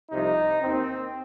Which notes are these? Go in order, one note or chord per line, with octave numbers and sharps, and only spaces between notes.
C2 C3 F3 D#4
D#2 D#3 C4